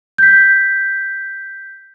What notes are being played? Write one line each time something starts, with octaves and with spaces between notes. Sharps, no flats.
G6 B6